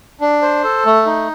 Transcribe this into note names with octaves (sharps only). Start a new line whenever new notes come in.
D4
C5
A4
A3
D#4